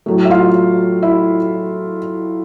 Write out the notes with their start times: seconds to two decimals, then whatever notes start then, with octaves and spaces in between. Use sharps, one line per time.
0.06 A2 F#3 A3
0.25 E5
0.30 F4 F5
1.02 E4 E5